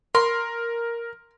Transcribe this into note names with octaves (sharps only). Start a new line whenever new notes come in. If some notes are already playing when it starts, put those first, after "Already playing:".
A#4 C6